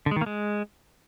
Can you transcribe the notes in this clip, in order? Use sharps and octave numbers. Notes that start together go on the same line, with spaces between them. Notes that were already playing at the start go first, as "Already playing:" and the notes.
D3
G#3
D#3
A#3
G#3